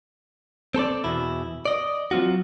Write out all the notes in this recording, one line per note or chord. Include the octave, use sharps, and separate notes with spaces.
C4 A4 C5 D5
E2 B2 E4
D5 D#5
F#3 C4 F4 F#4